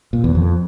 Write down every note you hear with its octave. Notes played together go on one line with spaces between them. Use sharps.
A#2
E2
F2